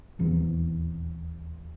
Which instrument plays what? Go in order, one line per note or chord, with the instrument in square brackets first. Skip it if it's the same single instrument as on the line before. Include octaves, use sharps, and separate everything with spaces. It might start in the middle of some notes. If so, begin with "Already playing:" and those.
[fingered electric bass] D#1 E2 E3 C4